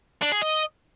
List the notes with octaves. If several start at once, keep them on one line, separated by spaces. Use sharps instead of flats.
D4
G#4
D#5